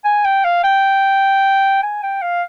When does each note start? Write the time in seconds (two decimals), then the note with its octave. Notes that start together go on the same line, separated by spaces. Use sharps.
0.04 G#5
0.25 G5
0.44 F5
0.64 G5
1.83 G#5
2.03 G5
2.22 F5